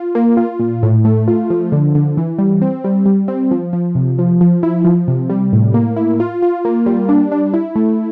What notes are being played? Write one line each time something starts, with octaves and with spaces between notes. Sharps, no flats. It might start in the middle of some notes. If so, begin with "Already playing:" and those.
Already playing: F4
A#3
F4
A#2
A2
A3
F4
F3
D3
D3
E3
G3
C4
G3
G3
C4
F3
F3
C3
F3
F3
E4
F3
C3
G3
A2
A#3
E4
F4
F4
A#3
G3
D4
D4
E4
A3